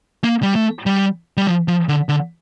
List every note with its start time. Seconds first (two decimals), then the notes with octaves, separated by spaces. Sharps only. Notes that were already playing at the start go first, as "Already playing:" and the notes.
0.24 A#3
0.43 G3
0.56 A3
0.86 G3
1.37 G3
1.47 F3
1.68 F3
1.89 D3
2.09 D3